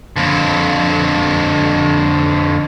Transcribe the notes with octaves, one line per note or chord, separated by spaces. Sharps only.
F2 D3